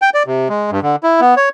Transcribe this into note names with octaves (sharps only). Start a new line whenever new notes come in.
G5
D5
C3
G#3
G2
D3
E4
B3
C#5